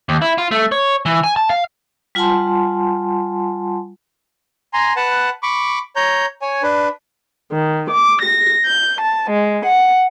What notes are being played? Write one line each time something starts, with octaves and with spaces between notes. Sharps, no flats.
D#2
E4
F4
A3
C#5
E3
G#5
A5
F5
G3 F4 F#5 G#5 A5 C6
G#5 A#5 C6
B4 F#5 A5
B5 C#6 D6
C#5 A#5 G6
C#5 G#5
D4 B4
D#3
D6
A#6
G6
A5
G#3
F#5